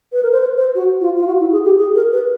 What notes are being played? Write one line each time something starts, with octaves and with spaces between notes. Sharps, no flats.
B4
A#4
C5
B4
C5
F#4
F4
F4
F#4
E4
G#4
G4
G#4
A#4
B4